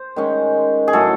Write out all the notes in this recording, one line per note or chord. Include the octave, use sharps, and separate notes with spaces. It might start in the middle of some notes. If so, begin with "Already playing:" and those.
Already playing: C5
D#3 G#3 C#4
G#4
A2 F#3 C#4 A4